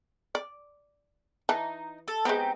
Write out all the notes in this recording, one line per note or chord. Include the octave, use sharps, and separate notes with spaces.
D5
E3 D#4 A5
A4
G#3 B3 C4 D#4 G4